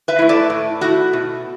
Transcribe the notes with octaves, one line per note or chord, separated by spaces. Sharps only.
B4 E5
A3 E4
A4 D5
A2
A3 E4 F#4
B2